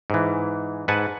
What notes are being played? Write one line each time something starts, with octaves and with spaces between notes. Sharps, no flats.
G#2 E3
G#2 B4 F#5 G#5 A5